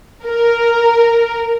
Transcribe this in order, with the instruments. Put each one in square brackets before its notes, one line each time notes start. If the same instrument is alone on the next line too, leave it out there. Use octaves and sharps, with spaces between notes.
[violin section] A#4